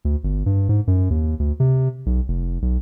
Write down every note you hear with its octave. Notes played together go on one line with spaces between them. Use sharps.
D2
G1
G2
G#2
F#2
D#2
D2
C3
B1
F1
B1